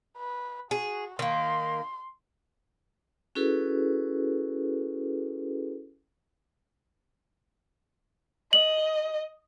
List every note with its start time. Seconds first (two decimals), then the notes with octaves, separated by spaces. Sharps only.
0.17 B4
0.71 F#4 G#4
1.19 D#3 A#3 C6
3.35 C#4 E4 F#4 G#4 A4 B4
8.53 D#5 F#7